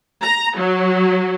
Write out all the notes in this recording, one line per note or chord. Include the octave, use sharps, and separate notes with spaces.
A#5
F#3